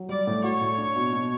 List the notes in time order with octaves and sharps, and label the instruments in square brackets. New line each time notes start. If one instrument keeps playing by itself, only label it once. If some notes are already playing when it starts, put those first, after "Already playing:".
Already playing: [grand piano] F#3
[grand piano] G3 [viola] D5
[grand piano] A2
[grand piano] F#4 [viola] C#5
[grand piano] A2
D4
B2
B2